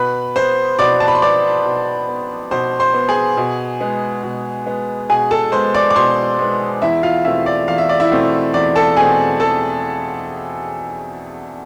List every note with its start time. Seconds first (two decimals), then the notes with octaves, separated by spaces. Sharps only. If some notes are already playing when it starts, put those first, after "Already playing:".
Already playing: B2 B4 B5
0.36 B3 C5 C6
0.79 B2 D5 D6
1.00 A5
1.08 B5
1.15 C6
1.22 B3 D5 D6
1.65 B2
2.08 B3
2.51 B2 C5 C6
2.80 C5 C6
2.94 B3
3.09 G#4 G#5
3.37 B2
3.80 G#3 B3
4.23 B2
4.66 G#3 B3
5.09 B2 G#4 G#5
5.31 A4 A5
5.52 G#3 B3 C5 C6
5.74 D5 D6
5.90 D6
5.95 B2 C5 C6
6.39 G#3 B3
6.82 E2 E4 E5
7.03 F4 F5
7.25 B2 A3 C4 E4 E5
7.46 D5
7.68 E2 F5
7.78 E5
7.89 D5
8.00 E4 E5
8.11 B2 A3 C4
8.54 E2 D5
8.76 A4 A5
8.97 B2 A3 C4 G#4 G#5
9.40 E2 A4 A5